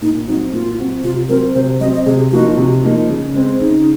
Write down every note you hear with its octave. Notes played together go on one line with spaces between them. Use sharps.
A#2 D#4
F#3 C4 D#4 F#4
A#2 F4
F#3 C4 F#4
C3 F4
F#3 C4 A#4
C3 C5
F#3 C4 D#5
D#5
C3 G#4
F3 A#3 D#4 F#4
C3
F3 A#3 D#4
C#3
G#3 C4
C#3 D#4